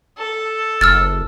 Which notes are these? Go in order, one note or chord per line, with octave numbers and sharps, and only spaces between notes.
A4
F#1 E6 F6 A6